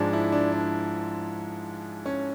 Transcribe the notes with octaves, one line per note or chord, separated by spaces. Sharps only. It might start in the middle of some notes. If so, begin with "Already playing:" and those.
Already playing: G#2 F3 G#3 D4
E4
D4
D4
C#4